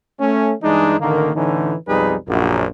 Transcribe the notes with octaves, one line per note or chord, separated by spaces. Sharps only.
A3 C#4
G2 E3 G#3 D4 D#4
A1 D3 D#3 A#3
A2 D3 E3 C#4 D#4
B1 F2 G3 D#4 G#4 B4
A#1 F#2